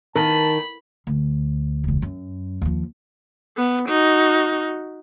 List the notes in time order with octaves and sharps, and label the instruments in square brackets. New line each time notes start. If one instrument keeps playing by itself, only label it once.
[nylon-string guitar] D#3 [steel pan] A#4 [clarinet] A5 [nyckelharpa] B5
[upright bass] D2
E1 C#2
F#2
D#2 F3
[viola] B3
D#4 F#4